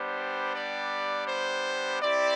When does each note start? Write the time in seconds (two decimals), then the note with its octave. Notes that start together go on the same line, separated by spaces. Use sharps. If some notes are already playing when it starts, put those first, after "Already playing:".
Already playing: G3 B3 D4 G4 C5
0.54 D5
1.28 C5
2.01 C4 E4 G4 D5